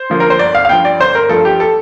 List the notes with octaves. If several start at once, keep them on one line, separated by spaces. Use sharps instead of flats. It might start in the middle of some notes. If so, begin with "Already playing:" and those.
Already playing: C5
D3 F3 A#3
A#4
C5
G1 D5
F5
F5
G2 F3 G5
D5
G1 C5
A#4
G2 F3 A4
G4
A4